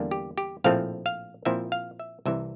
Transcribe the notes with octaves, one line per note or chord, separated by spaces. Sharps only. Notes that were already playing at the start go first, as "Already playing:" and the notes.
Already playing: E2 D3 G3 A#3 D4
G4
G4
A#1 A2 F3 A3 C4 F5
F5
A#2 F3 C4 E4 E5
F5
E5
C2 C3 E3 E5